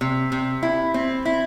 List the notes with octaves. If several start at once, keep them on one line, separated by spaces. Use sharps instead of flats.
C3
C3
E4
C4
E4